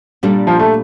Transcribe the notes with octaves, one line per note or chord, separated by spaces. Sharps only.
A#2 G3 D4 A4
F3
A3